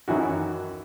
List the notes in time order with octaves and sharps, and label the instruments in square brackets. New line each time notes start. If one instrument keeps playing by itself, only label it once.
[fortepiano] F#2 D#3 E3 C#4 E4 F#4